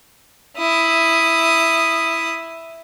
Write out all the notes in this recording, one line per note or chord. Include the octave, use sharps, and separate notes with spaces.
E4 D#6